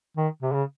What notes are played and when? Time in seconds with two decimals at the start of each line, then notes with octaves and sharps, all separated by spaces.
0.17 D#3
0.42 C3
0.52 C#3